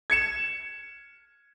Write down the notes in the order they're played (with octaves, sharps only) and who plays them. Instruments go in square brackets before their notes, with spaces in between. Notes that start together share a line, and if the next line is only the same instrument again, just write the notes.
[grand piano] G#6 C#7 E7